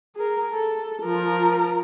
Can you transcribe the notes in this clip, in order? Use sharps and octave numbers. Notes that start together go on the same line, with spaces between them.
G#4 A#4
A4
F3 A#4